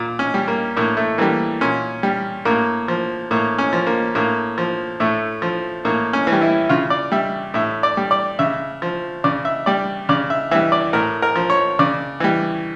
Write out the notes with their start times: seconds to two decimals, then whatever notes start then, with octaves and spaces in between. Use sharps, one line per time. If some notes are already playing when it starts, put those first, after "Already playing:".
Already playing: A#2
0.19 C#4
0.34 G3
0.48 A#3
0.77 A2 A#3
0.97 A3
1.18 E3 G3 A#3
1.61 A#2 C#4
2.03 G3
2.45 A2 A#3
2.88 F3
3.31 A2 A#3
3.58 C#4
3.73 F3
3.87 A#3
4.15 A2 A#3
4.58 F3
5.00 A2 A3
5.42 F3
5.85 A2 A#3
6.13 C#4
6.27 E3
6.32 G3
6.41 E4
6.69 C#3 F4
6.90 D5
7.12 G3 E5
7.54 A2 E5
7.83 D5
7.97 G3
8.11 D5
8.39 C#3 E5
8.82 F3
9.24 C#3 D5
9.45 E5
9.66 G3 D5
10.09 C#3 D5
10.30 E5
10.51 E3 E5
10.55 G3
10.72 D5
10.93 A2 A#4
11.22 A#4
11.36 F3
11.50 C#5
11.79 C#3 D5
12.20 E3 G3